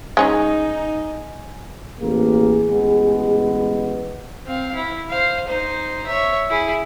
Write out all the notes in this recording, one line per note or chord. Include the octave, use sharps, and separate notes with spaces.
G#3 C#4 D#4 G#4 G#5
A1 A#3 G#4
A1 G#3 B3
C4 F5
E4
C5 F5
D#4 C5
C#5 E5
E4 G#4